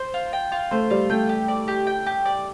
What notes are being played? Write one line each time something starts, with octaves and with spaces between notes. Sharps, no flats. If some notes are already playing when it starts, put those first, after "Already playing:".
Already playing: C5
F4
G5
F4
A3 C5
G3 F4
A3 G5
G4
D5
G4
G5
G4
D5